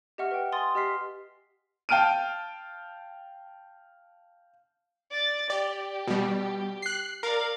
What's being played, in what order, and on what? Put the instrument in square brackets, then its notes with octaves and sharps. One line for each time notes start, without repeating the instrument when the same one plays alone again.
[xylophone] G4 D#5 E5 F#5 C#6 F6
B4 G5
G#5 C6 D#6 A6
G4 D#5 C6 F6 B6 C7
[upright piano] F5 G5 A5 F6 D7 D#7
[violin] D5 A6
[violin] G4 [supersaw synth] D5
[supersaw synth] B2 G3
F#6 C7
[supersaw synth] A#4 [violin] D5 F5